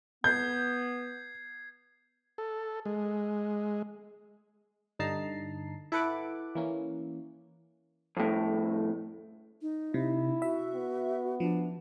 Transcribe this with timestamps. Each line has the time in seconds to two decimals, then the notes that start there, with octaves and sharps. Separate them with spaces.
0.24 B3 G6 G#6 C7
2.38 A4
2.85 G#3
4.99 G2 D3 D#4 A5 A#5 C7
5.92 E4 A4 B4 F#5 D6
6.55 E3 A#3 C#4
8.17 F2 A2
9.61 D#4
9.94 C3 E4
10.42 F#4 E5
10.75 B3
11.40 F3 D4